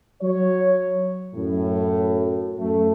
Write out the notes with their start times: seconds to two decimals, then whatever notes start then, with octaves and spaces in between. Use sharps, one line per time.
0.22 F#3 C#5
1.34 F#2 A2
2.59 F#2 A3